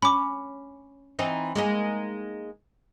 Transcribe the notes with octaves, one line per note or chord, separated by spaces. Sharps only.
C#4 B5 D6
E3 C4 D#4
G#3 A#3 D#4